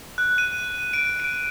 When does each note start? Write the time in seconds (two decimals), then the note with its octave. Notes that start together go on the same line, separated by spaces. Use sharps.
0.18 F#6
0.38 D#7
0.93 D7
1.20 D7